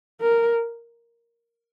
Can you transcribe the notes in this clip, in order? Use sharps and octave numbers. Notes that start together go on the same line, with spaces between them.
A#4